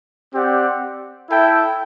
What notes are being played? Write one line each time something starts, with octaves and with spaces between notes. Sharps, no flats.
C4 G4 D5 F#5
E4 A4 E5 G5